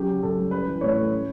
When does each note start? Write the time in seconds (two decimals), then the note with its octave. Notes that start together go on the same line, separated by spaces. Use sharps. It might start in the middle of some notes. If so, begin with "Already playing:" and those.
Already playing: F#3 C#4 G4
0.08 C#3
0.22 F#2 A4
0.38 G3
0.51 C#4 B4
0.67 E3
0.81 A2 C#5
0.96 A3
1.11 C#4